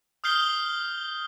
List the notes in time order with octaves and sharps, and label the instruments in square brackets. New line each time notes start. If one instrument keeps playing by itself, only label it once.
[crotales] D#6 F6 G6 C7 G7